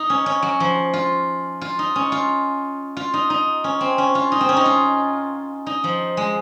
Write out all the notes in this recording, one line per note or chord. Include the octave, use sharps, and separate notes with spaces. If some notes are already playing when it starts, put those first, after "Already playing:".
Already playing: D#4
C#4
C#4
F#3
F3
F4
F4
D#4
C#4
F4
F4
D#4
D#4
C#4
C4
C#4
F4
D#4
C4
C#4
D#4
F4
D#4
F3
G#3